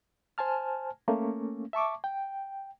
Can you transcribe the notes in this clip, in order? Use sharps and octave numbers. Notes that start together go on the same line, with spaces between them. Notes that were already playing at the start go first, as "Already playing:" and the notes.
C5 G#5 A5 F6
A3 A#3 C#4
E5 A5 C#6 D6
G5